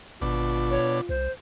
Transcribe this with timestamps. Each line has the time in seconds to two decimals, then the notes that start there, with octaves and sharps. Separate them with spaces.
0.22 G#1 B2 D4 F4
0.71 C#5
1.09 C2 C5